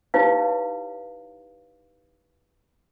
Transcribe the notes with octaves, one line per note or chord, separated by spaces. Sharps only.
D#4 E4 G4 B4 C#5 F5